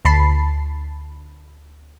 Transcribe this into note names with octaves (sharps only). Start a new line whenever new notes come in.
D2 A5 B5 C7